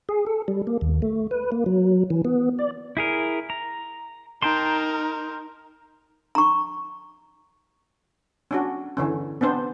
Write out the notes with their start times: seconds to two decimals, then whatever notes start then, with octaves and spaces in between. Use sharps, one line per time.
0.09 G#4
0.27 A4
0.48 G3
0.67 A#3
0.81 D#2
1.02 A3
1.31 B4
1.52 A#3
1.66 F#3
2.10 E3
2.25 B3
2.59 D5
2.97 E4 G#4 A#4
3.50 A#5
4.42 D#4 A#4 G5 A5 C6
6.35 A#5 C#6
8.51 C#4 D4 F#4
8.97 D3 E3 C#4
9.41 B3 C4 D4 C5